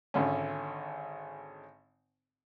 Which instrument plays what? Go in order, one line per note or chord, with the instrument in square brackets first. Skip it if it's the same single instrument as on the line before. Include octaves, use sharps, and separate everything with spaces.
[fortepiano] G#1 D3 C#4